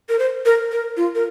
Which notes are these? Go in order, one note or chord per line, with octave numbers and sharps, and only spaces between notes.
A#4
C5
A#4
A#4
F4
A#4